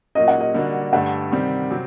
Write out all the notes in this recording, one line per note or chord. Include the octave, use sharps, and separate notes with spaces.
A#2 F#3 A#3 F#4 D#5
F#5
D#5
D3 G3 A#3 D4 F#4
G2 D3 A3 F#5
C3 D#3 G3 C4
C3 F#3 C4